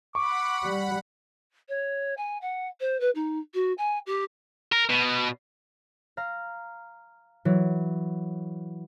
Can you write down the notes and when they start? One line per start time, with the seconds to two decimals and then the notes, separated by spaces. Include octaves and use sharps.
0.15 F#5 B5 C#6 D6
0.65 G3
1.69 C#5
2.17 G#5
2.42 F#5
2.80 C5
3.00 B4
3.15 D#4
3.54 F#4
3.78 G#5
4.06 G4
4.72 A#4
4.89 B2
6.17 F5 A#5
7.45 E3 F#3